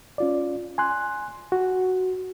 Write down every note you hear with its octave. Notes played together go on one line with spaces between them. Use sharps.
C#4 F4 D5
G#5 C6 F#6
F#4